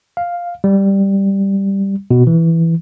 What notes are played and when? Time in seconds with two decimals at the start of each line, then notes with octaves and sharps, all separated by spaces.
0.17 F5
0.64 G3
2.11 B2
2.27 E3